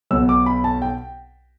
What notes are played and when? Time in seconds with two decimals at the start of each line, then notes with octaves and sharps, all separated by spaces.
0.11 B1 B2 B3 E6
0.29 D6
0.46 B5
0.64 A5
0.82 G5